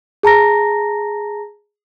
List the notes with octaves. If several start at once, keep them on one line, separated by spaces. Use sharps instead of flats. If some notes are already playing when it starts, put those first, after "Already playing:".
G#4 A5 A#5 A#6